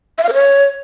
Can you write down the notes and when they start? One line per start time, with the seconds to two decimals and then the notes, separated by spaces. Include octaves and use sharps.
0.18 E5
0.23 F5
0.29 A#4
0.34 C#5